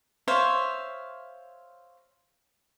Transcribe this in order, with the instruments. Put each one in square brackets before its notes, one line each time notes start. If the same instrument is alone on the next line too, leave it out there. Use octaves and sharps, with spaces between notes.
[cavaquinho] C5 C#5 E5 F5